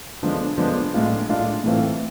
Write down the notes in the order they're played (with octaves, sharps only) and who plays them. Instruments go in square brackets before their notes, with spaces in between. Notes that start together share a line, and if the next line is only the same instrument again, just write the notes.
[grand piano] D3 F3 G#3 B3 D4
D3 F3 G#3 B3 D4
A2 G#3 D4 F4
A2 G#3 D4 F4
A2 E3 A3 C4 F4